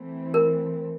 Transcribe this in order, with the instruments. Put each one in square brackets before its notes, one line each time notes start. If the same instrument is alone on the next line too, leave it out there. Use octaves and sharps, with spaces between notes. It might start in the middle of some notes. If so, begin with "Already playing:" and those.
Already playing: [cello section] E3 A3 C4
[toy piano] A#4